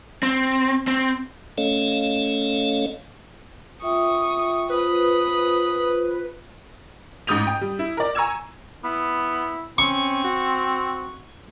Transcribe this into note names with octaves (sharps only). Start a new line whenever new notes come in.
C4
C4
A3 C#4 A4 C#5 D#5 F5
F4 E5 G5 C#6 D#6
F4 B4 C5 B5 D#6
A1 G#2 D#6 G6 F7
G5
G3
E4
A#4 D5
G#5 A#5 C#6 E6 G#6 E7
B3 E4
C4 C#4 C#6
F#4